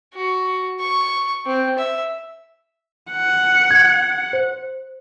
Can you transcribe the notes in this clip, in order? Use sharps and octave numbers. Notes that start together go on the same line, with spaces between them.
F#4
C#6
C4
E5
F#5
G#6
C5